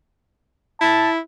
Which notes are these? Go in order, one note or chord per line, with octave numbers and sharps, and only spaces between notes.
E4 A5